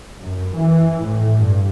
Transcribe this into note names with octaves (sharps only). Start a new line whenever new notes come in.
F#2
E3
A2
G2